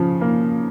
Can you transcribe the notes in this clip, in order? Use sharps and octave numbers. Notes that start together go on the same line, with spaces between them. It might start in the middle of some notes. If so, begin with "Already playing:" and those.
Already playing: C#3 F3
A#3